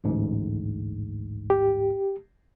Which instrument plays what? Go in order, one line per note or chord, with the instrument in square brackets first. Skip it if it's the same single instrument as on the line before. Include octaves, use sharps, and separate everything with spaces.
[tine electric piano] A1 D2 G#2
[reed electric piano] G4